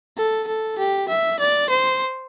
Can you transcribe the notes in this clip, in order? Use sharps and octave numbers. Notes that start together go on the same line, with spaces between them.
A4
A4
G4
E5
D5
C5